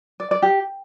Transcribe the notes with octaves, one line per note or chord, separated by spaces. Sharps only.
D5
D5
G4